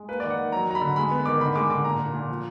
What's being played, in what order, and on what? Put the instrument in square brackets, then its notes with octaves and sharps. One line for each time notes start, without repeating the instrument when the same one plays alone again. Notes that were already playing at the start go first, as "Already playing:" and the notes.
Already playing: [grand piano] G#3
A#3 B4
D#3 D5
F#5
D#3
F#3 A#5
F#3 A#5
B5
D3
G#3 B5
B3
D#3 D6
D3 B5
G#3 D6
D3 D6
A#2 A#5
A#2
A#2
F3